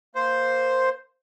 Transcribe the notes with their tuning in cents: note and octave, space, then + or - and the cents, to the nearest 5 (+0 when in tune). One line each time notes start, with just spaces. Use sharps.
A#3 +0 C5 +0